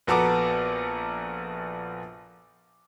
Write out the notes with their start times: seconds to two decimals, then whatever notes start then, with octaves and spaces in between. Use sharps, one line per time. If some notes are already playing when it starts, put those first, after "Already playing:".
0.07 A#1 B3 F#4 A4 A#5 D6